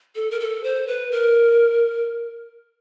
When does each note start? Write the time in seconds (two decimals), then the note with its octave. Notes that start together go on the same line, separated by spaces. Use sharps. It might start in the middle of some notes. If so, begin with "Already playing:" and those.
0.15 A4
0.31 A#4
0.40 A4
0.64 C5
0.87 B4
1.11 A#4